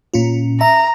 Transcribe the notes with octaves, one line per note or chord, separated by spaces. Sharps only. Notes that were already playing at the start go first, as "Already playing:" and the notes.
A#2 C#4 F4
E5 A#5